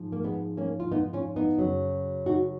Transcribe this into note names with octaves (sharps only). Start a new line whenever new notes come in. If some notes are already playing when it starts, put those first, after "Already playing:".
Already playing: G#2 F3
A#3
G#3 B3
A#3 C#4
F4
B3 D#4
C#4 F4
B3 D#4
F#2 C#3 F#3
D#4 F#4